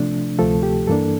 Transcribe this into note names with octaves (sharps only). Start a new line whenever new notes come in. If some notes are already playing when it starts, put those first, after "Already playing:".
Already playing: C3 F3 A3 D4
D2 C3 F3 A3 A4
G4
G2 E3 A#3 D4 A4